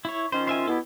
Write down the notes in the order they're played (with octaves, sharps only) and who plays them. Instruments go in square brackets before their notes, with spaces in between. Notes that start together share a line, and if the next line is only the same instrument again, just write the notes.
[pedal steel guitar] E4 C#5
[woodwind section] D#3 C#4 F4 [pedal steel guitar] C5
[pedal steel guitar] C5 E5 G#5
[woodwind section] B2 B3 E4 [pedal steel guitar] G4 A4